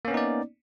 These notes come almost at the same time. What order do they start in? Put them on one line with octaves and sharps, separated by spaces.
A#3 C#4 B3 D#4 D5